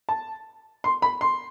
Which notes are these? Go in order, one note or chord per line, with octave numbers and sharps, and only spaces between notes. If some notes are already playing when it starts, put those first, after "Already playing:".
A5
C6
B5
C6